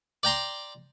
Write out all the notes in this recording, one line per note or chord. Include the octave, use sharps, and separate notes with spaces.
D5 G5 A#5 C6